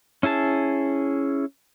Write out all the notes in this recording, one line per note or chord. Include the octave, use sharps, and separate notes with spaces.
C#4 E4 G#4 A5